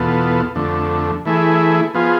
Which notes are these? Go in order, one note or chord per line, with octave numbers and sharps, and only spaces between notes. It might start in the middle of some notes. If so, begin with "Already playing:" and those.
Already playing: E2 B2 B3 F4 A4
F2 D3 A3
E3 A3 E4 G#4
F3 B3 F4 G#4